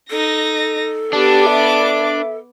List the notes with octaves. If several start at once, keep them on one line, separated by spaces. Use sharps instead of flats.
D#4 A4 A#6
B3 D4 G4 D6
E5